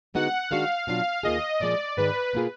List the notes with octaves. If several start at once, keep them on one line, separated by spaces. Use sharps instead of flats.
D3 G#3 B3 D#4 F#4 F#5
D#3 G#3 D4 F#4 F5
B2 F#3 D4 F4 F5
D#2 D#3 A#3 F4 G#4 D#5
A#2 F3 G#3 D5
G#2 D#3 G#3 B4
B2 A#3 F4 G#4